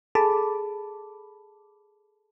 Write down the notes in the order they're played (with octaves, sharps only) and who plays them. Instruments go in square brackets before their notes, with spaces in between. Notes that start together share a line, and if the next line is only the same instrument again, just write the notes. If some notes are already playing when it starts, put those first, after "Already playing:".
[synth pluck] G#4 A4 A5 B5 D6